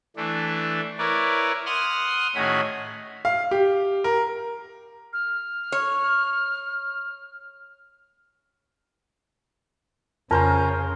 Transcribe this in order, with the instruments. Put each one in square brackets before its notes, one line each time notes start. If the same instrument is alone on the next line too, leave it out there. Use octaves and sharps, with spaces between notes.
[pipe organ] E3 A3 D4
E4 A#4 B4 C#5 D5
F#5 C6 D#6 F6
A2 D#3 C#4 F#4 G#4 B5
[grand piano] F5
G4
A#4
[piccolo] F6
[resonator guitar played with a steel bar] C#5
[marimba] F2 C6 [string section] C#3 [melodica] C#4 [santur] A#4 C5